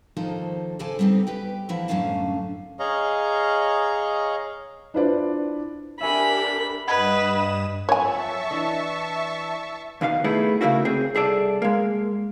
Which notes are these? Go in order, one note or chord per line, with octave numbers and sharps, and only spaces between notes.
D#3 F3 A#3 D#4 A4 C5
F2 C#3 A4 C5 D5 G#5
G3 B3 C4 D#4 A4
G4 B4 G5
E2 F3 A#3 E4 F#5
F#2 A2 D3 C#4 F5 A5
G#4 C#5 D#5 F5 A#5
D4 E4 F4 B4 C5 D5
D4 G4 A#4 E5 G#5 B5 C#7
G2 B4 D#5 F#5 B5 D#6 G#6 E7
F2 F#3 F#4 C#5 E5 G#5 A5 C#6
E3 D4 D#5
D#2 B2 F#4 F5
A3 B3 D#4 E4 G#4
C#3 A3 A#3 E4 F#4
C4 G#4
C2 G#4 A4 D5
G#3 A#3